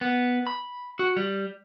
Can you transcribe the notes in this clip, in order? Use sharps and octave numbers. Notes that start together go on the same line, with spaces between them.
B3
B5
F#4
G3